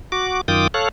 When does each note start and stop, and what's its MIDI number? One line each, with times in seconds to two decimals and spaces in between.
0.12 0.41 66
0.12 0.41 86
0.48 0.67 42
0.48 0.67 51
0.48 0.67 65
0.48 0.67 79
0.48 0.67 86
0.48 0.67 87
0.74 0.89 69
0.74 0.89 73
0.74 0.89 77
0.74 0.89 90